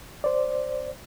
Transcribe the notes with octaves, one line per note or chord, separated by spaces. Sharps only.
C5 D5